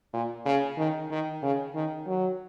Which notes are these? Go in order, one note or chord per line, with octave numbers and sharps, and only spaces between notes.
A#2
C#3
D#3
D#3
C#3
D#3
F#3